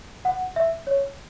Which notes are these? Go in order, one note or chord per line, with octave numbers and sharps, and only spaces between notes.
F#5
E5
C#5